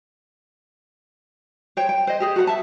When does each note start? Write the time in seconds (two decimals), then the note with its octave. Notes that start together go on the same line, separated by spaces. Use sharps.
1.77 C5 C#5 G5
1.89 G5
2.07 C5 D#5
2.20 G4 G#4 C5
2.36 F#4 A4 F#5
2.47 E5 A5